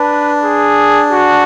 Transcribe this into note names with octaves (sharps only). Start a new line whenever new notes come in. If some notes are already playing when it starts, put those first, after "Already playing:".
Already playing: D4 B4
G#4
F#4